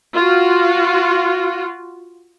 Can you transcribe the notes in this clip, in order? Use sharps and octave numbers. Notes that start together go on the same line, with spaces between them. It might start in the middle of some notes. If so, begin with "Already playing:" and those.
F4 F#4